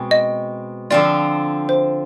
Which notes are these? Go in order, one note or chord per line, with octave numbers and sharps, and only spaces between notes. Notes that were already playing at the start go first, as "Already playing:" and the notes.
Already playing: B2 G#3 C4
D#5
D3 F3 C4 F4 D5
C5